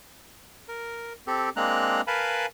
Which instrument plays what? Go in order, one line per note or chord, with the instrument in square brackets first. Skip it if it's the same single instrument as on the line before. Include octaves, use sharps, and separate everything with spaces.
[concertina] A#4
C4 G4 A4
G#3 A#3 C4 D4 A#5 F#6
A#4 B4 F5 G#5 A5 B5